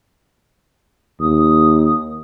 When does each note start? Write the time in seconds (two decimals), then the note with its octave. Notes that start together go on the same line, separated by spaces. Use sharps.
1.20 D#2 D#6